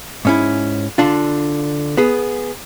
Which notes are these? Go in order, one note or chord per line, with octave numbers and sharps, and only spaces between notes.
G#2 C#4 E4
D3 D4 F4
B3 G#4